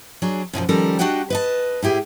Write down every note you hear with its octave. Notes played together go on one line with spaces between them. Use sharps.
F#3 D4 G#4
F#2 B2 D#3 F3
D#3 F3 G3 C#4 A4 A#4
D4 F#4 G4 D#5 F#5 G5
B4 D#5 A5
A2 E4 G4 G#4